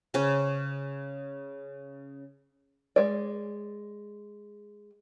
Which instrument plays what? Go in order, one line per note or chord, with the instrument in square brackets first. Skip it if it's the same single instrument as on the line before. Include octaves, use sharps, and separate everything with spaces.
[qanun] C#3 C#4
[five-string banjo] G#3 D5